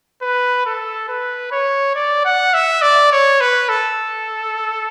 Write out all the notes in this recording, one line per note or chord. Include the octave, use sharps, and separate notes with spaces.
B4
A4
B4
C#5
D5
F#5
E5
D5
C#5
B4
A4